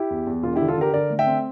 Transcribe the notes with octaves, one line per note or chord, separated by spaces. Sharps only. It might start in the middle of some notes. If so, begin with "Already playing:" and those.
Already playing: E4 G4
E2
E2
E1 F4
E4 G4
D3
F4 A4
D3 G4 A#4
D3 A#4 D5
A3
E5 G5
C4